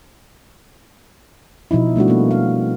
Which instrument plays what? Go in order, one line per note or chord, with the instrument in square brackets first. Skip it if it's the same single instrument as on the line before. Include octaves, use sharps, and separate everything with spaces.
[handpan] B2 F3 D#4 E4
G3 A3 D4 F#4
A#3 B3
F5